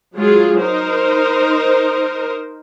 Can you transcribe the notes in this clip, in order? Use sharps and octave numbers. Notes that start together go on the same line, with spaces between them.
F#3 G#3 F4 G#4
D#4 A#4 C5